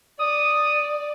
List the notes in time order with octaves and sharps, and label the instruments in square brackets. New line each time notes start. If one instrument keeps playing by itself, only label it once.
[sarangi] D5 [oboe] D#6